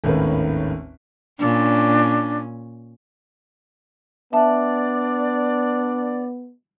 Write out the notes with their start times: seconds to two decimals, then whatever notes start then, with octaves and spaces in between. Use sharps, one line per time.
0.04 G#1 D#2 A2 C#4 A#4 B4
1.39 A#2 C#4 D4
4.33 B3 D4 D5 E5 A5